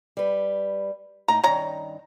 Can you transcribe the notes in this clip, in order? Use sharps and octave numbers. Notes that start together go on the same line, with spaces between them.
G3 B4
A2 D#4 A#5
G2 D#3 C#4 A#5